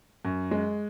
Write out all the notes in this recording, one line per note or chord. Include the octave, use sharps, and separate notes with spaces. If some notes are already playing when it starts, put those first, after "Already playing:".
F#2
G#3